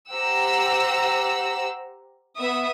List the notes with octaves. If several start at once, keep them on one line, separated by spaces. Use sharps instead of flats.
G4 C5 F#5 A#5 E6
B3 E5 D#6